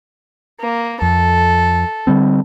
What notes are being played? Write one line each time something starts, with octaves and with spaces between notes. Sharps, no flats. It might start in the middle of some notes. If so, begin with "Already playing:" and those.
A#3
F2 A4
D3 G3 C4